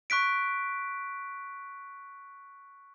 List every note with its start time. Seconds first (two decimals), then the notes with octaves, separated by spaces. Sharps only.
0.10 C#6 F#6 B6 D7